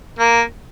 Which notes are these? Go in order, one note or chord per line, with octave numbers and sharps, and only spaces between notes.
A#3